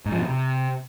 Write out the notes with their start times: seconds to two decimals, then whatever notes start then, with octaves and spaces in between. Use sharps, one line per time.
0.06 G#2
0.12 F3
0.19 B2
0.25 C3